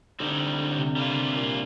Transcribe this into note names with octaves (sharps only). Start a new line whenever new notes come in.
A2 D3 G3 C4 D#4
D3
C3
D3 G3 A#3 F4
C3
A#2